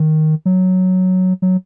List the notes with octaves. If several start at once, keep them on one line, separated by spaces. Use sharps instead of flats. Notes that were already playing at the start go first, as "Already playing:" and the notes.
Already playing: D#3
F#3
F#3